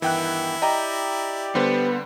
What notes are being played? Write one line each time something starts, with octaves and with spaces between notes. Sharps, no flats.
G2 D#3 E3 B3 E4 G5 F#6
G4 D5 D#5 G5 A#5
D3 G3 B3 C5